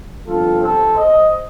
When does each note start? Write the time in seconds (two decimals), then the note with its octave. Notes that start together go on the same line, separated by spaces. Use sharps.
0.27 G1 G2 F3 C4 F4 A4
0.62 A4 C5
0.97 C5 D#5